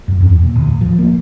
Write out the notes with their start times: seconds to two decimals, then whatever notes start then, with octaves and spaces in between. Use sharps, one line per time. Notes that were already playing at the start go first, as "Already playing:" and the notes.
0.08 F#2
0.20 E2
0.42 A#2
0.56 D1
0.81 F3
0.99 A#3